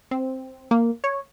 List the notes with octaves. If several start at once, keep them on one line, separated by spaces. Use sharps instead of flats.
C4
A#3
C#5